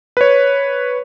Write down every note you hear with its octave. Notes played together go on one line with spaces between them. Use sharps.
B4 C#5